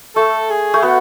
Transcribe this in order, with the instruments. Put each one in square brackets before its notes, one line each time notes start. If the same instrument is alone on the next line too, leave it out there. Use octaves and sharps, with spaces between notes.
[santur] A3 [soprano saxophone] A4
[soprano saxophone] G#4
[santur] A3
[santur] B3 [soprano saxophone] F#4